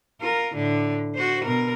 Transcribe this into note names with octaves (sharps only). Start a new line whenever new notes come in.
F4 A#4
A2 D3
F#4 C5
B2 A#4